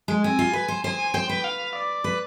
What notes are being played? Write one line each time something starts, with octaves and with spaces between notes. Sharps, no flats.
G#3
C4 G#5
F4
B4
C5
C5 G#5
C5 G5
B4
F5
D5
B4